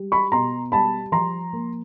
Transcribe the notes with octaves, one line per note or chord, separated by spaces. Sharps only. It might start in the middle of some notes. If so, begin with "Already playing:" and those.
Already playing: G3
B5 C#6
B2 A#5 C6
G3 A5 B5
F3 A#5 C6
A#3